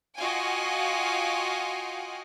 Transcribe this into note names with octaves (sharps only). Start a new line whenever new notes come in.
F4 F#4 D#5 F5 G5 G#5